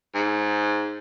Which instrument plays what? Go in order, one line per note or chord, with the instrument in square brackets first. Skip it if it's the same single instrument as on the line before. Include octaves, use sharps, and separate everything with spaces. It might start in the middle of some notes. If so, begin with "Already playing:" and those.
[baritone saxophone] G#2